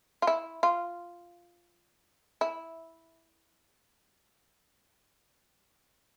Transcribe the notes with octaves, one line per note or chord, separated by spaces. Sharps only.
F4
E4
F4
E4